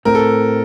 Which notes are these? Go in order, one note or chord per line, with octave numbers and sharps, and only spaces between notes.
A2 A3 C4 A#4
A4